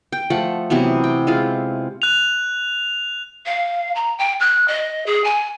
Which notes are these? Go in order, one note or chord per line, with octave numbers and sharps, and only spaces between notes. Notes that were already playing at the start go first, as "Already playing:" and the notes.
G5
F3 A3 F#5
C3 E3 F#3 B3
G5
G#3 E4 F4
F#6 F7
F5
A#5
G5
F#6
D#5
G#4
G#5